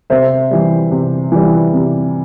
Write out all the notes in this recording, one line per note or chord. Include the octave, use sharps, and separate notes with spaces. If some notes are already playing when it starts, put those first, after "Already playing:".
C3 C5 E5
E3 G3
C3
E3 G3
C3